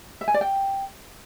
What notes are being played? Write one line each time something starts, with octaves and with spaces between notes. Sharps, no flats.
E5
G#5
D5
G5